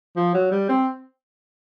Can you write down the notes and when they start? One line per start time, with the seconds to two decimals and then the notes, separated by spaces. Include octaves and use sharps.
0.17 F3
0.34 F#3
0.52 G3
0.69 C4